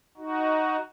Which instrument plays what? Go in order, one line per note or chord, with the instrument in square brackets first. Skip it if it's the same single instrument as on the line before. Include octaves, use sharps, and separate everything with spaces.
[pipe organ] D#4 F#4